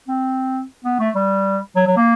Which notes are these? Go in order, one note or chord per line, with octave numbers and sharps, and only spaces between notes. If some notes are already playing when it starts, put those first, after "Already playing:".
C4
B3
A3
G3
F#3
F#3
A#3